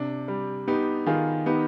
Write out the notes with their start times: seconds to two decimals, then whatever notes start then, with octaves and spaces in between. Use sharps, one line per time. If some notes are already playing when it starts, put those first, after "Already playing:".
Already playing: C3 D4
0.28 G3
0.68 B3 D#4 G4
1.06 D#3 F4 G#4
1.46 B3 D#4 G4